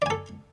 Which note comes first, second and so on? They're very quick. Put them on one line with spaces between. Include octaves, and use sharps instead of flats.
D5 G#5 A4